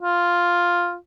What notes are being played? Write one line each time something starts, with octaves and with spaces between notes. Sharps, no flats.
F4